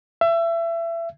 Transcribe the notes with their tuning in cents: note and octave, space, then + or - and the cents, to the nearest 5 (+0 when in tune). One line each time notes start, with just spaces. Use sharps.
E5 +30